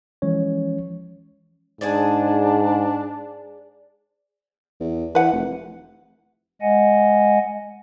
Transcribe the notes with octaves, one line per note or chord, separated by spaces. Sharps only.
E3 F3 G#3 C#4 C#5
G#2 D4 G#4 C5 D5
E2
E3 B4 F#5
F1
G#3 D#5 F#5 G#5